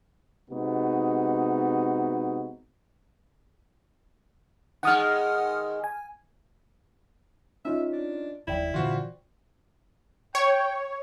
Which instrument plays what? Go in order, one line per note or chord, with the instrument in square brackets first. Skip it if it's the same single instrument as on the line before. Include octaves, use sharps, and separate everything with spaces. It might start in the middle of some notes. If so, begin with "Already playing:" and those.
[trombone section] C3 G#3 B3 D#4 F#4
[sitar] D#3 G#3 [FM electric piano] F#5 D#6 F6
[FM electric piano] G#5
[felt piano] C#4 D#4 F4 [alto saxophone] E5
[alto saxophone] D4
[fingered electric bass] F1 D#2 [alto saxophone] E4 [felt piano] D5 G5
[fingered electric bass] A#2 D3 E3 [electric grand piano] F4 F#4 C5
[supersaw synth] C#5 [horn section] G5